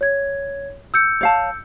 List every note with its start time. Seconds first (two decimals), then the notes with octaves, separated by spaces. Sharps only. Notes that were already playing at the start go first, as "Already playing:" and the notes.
0.01 C#5 G#6
0.94 E6 G6 C#7
1.21 C#5 F5 A5